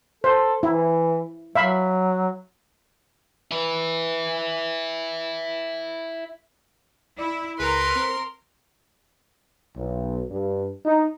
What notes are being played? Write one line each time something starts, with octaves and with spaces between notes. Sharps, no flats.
A4 C5
E3 E4
F#3 E5 F5 B5
E4 B4
E4 D5
C#2 G#4 A#4 B4 C6
C4
B1
G2
D#4